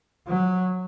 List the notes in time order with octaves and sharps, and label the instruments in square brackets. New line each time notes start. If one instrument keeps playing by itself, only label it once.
[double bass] F#3